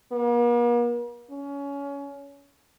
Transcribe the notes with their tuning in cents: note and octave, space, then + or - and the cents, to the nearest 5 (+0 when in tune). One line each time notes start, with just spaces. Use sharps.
A#3 +45
C#4 +25